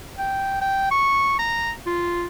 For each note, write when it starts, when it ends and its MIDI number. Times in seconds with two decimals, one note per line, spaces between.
0.18 0.57 79
0.61 0.88 79
0.91 1.38 85
1.39 1.71 82
1.86 2.26 65